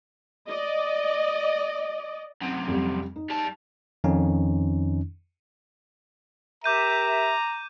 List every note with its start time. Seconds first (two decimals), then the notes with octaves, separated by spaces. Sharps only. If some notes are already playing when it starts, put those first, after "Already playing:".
0.48 D5 D#5
2.42 F#2 C3
2.68 F2 G3
3.16 D#4
3.30 G3 A5
4.04 F2 D#3 C#4 D#4
6.64 G4 A#4 E5 A#5 D6 G6 D#7